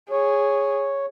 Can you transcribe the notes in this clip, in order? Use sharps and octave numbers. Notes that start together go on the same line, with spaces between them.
G#4 C#5